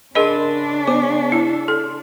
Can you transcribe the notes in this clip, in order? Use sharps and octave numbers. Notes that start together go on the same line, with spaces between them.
C#3 D4 G#4 A#4 D#5 B5 C6
B3 C5 G#5 D6
E4 A5 E6
A4 C6